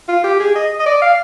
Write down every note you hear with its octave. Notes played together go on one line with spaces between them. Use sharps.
F4
G4
G#4
D#5
D#5
D5
F5